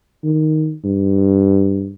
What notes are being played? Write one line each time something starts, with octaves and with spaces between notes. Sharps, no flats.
D#3
G2